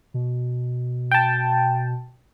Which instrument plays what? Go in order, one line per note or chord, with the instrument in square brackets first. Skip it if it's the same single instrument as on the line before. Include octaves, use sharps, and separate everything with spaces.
[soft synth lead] B2
[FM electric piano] G5 A5